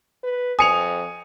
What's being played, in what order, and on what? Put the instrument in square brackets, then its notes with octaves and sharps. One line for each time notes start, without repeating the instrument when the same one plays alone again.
[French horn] B4
[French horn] F2 [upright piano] G#5 C#7 F7 [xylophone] D#6